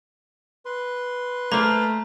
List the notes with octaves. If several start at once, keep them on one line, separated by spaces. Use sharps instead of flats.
B4 C6
A3 A#3 C5 F5 A#5